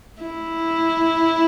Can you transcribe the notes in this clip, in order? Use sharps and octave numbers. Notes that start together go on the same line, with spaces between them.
E4